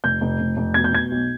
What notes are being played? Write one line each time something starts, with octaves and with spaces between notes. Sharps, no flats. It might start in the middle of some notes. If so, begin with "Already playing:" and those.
F1 G6
F1
F1
F1
B2 G#6
G6
B2 G#6
B1